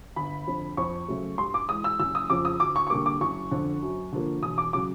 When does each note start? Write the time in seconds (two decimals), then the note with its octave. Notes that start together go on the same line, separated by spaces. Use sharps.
0.16 G1 B5
0.47 F2 D3 F3
0.77 F2 C#6
1.08 C#3 F#3 A3
1.38 G2 C6
1.54 D6
1.69 E3 G#3 D#6
1.84 E6
2.00 F#1 E6
2.15 D#6
2.30 F2 C#3 F3 D6
2.45 D#6
2.60 D2 D6
2.76 C#6
2.87 C#6
2.90 D3 G3 A#3 D6
3.06 D6
3.21 F#1 C#6
3.51 F2 D3
3.82 F#2
4.12 D3 F3 A#3
4.42 E1 D#6
4.58 D6
4.73 C#3 F#3 D6